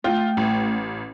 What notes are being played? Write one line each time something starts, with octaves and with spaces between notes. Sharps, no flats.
A3 F4 G5
A1